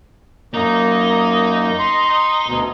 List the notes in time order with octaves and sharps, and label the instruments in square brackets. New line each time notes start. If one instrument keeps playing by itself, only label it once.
[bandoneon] F#2 A#3 [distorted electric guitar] D#4
[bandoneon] C6
D2 B2